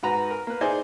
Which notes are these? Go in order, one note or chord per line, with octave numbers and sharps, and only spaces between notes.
G#2 F#4 B4 A#5
A#4
A#3 B4
D#4 E4 G#4 C5 D5 G#5